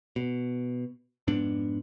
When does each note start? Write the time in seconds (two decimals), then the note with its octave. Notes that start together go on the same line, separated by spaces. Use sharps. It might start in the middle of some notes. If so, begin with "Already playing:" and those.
0.16 B2
1.27 F2 G#2 B3 D4